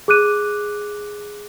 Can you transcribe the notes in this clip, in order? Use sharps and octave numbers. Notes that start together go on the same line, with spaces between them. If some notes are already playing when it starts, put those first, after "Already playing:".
G#4 D6 F#6 D#7